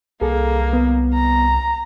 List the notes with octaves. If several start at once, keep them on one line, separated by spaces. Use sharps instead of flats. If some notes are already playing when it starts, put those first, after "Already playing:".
C2 A#3 G#4 A4
B3
A#5